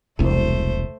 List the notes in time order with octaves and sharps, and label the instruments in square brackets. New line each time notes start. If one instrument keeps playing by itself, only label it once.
[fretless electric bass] E1 C2 [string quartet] A3 C5